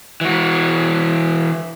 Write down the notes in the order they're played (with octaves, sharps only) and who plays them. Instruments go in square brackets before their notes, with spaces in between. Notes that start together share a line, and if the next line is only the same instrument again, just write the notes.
[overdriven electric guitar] E3 F#4